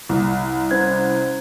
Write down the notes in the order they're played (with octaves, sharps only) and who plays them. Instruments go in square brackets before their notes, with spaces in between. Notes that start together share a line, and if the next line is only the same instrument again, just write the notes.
[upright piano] C2
[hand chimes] C#4 C5 G#6